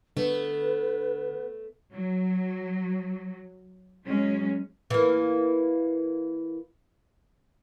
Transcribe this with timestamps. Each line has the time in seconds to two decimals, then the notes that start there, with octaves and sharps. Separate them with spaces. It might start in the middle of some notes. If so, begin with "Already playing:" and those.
0.17 D3 A3 B3 B4
1.92 F#3
4.05 F#3 G#3 C#4
4.90 E3 A#3